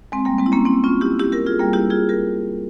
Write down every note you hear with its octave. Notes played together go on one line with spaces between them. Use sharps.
G#3 C4
G3 A#3
G#3 C4
E4
A#3 C#4
C4 E4
C#4 F4
E4 G4
E4 G4
G4 A#4
F4 G#4
G3 A#3
E4 G4
F4 G#4
G4 A#4